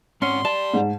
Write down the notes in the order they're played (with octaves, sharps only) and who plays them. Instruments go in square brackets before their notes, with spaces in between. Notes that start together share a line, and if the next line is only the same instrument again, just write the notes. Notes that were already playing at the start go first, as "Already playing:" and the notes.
[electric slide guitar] G#2 C4 F#5 [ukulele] C#4 [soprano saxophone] C6
[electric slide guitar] G4 D5 [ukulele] A5
[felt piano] G#2